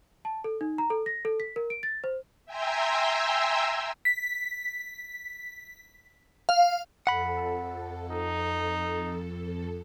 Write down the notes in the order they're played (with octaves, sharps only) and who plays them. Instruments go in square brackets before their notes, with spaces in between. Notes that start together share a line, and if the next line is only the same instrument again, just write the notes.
[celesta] A5
A4
D#4
A#5
A4
A#6
A4
B6
A#4
D7
A6
C5
[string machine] E5 G5 G#5 A#5 C6 E6
[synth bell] B6
F5
[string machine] F2 A4 [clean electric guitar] F#5 B5
[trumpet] D#4